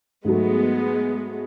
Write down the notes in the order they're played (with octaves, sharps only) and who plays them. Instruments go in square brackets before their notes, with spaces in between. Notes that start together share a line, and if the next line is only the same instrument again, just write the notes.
[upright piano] G#2 F#3 A3 [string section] G#3 B3